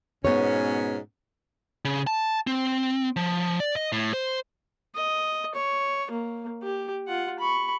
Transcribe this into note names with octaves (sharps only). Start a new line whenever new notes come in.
G#2 B2 B3 C#4 C#5
C#3
A5
C4
F3
D5
D#5
A2
C5
D#5
C#5
A#3
G4
F4 F#5
B5 C#6